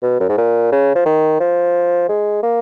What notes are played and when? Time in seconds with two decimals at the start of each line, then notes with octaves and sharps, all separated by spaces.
0.03 B2
0.20 F#2
0.29 G#2
0.37 A#2
0.72 C#3
0.95 F3
1.05 D#3
1.40 F3
2.09 G#3
2.43 A#3